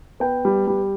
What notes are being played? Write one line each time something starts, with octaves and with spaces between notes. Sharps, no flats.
B3 G5
G3
G3